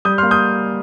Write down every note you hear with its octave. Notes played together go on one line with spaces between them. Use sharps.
G3 D#6 G6
C6 F6
A#3
D#6 G6